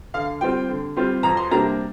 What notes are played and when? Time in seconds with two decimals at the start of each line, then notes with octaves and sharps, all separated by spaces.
0.14 D3 F5
0.41 G3 C4 F4 G5
0.68 D3
0.96 G3 C4 F4
1.23 F2 A#5
1.37 C6
1.51 C3 G3 A#3 D4 A#5